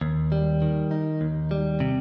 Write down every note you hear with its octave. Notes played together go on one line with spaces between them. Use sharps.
D#2
G3
D#3
D#4
D#2
G3
C3